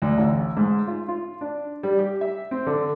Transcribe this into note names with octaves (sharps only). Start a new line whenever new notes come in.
D2
A1
G#2
F4
F4
D4
G3
G4
E5
C4
D3